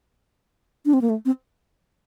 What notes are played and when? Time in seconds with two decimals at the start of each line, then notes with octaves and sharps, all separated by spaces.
0.86 D4
0.93 C4
1.02 A#3
1.10 A3
1.25 C4